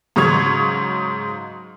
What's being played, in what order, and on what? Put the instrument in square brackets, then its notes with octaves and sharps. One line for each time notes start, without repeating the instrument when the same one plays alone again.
[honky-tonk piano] G#2 C#3 F#3 C#6 G#6 F7